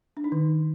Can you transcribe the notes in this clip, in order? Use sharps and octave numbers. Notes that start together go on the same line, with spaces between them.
D4
D#4
D#3